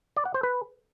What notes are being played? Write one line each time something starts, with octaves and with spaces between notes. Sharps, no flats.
D5
F#5
C5
B4